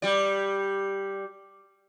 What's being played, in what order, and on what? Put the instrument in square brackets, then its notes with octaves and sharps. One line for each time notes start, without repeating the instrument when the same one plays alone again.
[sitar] G3 D5